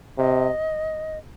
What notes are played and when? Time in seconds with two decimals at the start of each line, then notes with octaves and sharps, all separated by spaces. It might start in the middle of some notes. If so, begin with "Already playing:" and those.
0.18 C3 D#5